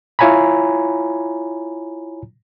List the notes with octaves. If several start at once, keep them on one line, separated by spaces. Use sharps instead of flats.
E4 F4 C#5 G#5 A#5 B5